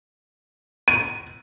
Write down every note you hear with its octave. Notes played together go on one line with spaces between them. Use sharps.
D#7